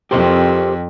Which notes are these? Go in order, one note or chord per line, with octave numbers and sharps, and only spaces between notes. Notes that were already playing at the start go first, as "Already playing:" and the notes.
F2 G4 A#4 C5